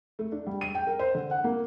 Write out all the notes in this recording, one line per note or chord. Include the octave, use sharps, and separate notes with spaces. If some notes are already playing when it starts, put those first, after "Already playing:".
A3
D4
G3
D#7
G5
A#4
C5
D3
F#5
A#3